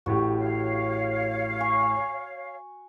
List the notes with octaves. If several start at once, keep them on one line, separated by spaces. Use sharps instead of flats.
A1 A2 F#4 G4
C#5 F5
G#5 C#6